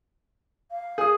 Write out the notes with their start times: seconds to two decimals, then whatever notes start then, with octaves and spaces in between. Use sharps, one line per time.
0.71 F5
0.98 G#4 D#6